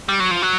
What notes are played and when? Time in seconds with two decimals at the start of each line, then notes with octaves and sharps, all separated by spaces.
0.09 G3
0.20 F#3
0.31 F3
0.42 F#3